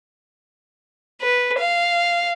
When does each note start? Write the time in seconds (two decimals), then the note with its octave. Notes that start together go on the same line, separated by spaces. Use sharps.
1.21 B4
1.58 F5